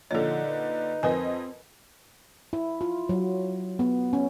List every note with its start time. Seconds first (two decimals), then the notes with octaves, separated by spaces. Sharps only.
0.11 A#2 D3 F3 D#4 A4 C#5
0.46 B4
1.03 F2 C4 A#4 B4 D#5 G#5
2.53 E4
2.81 F4
3.09 F#3
3.79 B3
4.13 C#4